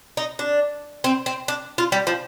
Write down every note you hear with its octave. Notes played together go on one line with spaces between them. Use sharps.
D#4
D4
C4
C4
D4
F4
G3
F3